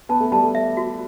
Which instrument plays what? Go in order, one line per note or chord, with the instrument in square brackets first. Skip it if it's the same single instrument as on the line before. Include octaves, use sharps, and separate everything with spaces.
[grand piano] B3 [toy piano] A5
[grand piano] A3
[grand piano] G3 [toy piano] A5
[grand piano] A3
[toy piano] E5
F#4